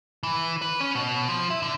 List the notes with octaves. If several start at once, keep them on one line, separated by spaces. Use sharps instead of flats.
E3
B4
C#4
B2
F3
E4
D3